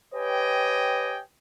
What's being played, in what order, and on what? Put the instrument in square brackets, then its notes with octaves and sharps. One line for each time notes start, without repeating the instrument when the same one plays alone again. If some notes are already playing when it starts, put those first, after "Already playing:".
[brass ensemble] G4 B4 C#5 D#5 G5 G#5